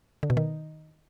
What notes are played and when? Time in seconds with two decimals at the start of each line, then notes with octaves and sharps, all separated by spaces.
0.23 D3
0.30 B2
0.37 D#3